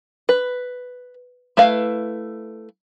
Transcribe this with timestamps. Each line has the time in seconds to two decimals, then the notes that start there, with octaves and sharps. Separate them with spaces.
0.29 B4
1.57 A3 E4 B4 F5